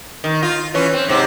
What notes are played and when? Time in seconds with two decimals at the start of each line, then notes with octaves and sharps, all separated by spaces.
0.24 D#3
0.43 F4
0.74 E3 C#4
0.93 C4
1.08 G#2 C3 C4